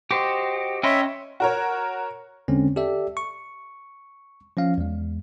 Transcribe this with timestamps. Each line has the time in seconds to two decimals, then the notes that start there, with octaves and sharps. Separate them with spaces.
0.11 F#4 G4 C5 D#5
0.83 C#4 C#5 D#5 E5 G5 B5 C6
1.40 F#4 A#4 C#5
2.48 E2 D3 G#3 C4 C#4
2.76 G4 A4 D5 E5
3.17 C#6
4.57 F3 C#4 F5
4.78 E2 G#3